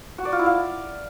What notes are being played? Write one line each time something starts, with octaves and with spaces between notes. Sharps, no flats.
F#4
D5
F4
E4
F5